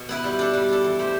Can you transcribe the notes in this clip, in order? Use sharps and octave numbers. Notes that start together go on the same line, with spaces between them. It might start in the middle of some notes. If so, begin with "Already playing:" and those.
Already playing: B2
B3 E4 B4
G3
D4 A4
G3
D4 A4
E3
A3 E4 G4 C5